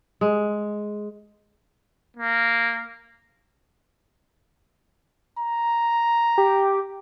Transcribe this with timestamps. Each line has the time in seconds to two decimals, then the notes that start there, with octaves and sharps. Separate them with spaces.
0.21 G#3
2.17 A#3
5.38 A#5
6.38 G4